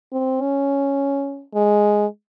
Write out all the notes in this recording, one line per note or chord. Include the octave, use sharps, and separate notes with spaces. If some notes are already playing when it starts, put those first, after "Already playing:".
C4
C#4
G#3